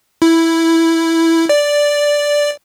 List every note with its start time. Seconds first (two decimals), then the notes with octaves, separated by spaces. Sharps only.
0.22 E4
1.49 D5